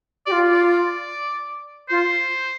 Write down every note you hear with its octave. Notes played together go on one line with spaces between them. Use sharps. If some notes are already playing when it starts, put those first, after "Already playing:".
F4 G4 D5
D5
F4 C5